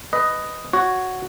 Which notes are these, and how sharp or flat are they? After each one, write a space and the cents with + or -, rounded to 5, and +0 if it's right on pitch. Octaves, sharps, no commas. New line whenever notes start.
B4 +10 D#5 +0
F#4 +0 C#5 +0